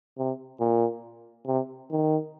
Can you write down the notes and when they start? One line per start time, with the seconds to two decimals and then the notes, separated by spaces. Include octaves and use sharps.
0.18 C3
0.60 A#2
1.47 C3
1.91 D#3